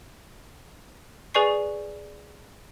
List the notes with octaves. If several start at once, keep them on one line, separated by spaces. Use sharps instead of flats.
G#4 B4 D5 G#5 C#6 C7